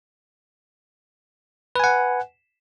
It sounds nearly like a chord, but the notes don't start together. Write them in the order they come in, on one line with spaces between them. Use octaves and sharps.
B4 G#5 F#5